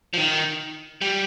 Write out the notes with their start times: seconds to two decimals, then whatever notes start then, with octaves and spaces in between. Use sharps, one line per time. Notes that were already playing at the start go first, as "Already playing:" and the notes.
0.14 F3
0.17 D#3
1.01 G3